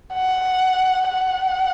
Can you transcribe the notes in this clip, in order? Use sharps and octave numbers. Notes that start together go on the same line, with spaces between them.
F#5
F#5